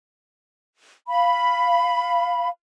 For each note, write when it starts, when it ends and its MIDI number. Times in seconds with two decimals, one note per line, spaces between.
1.07 2.48 77
1.07 2.48 83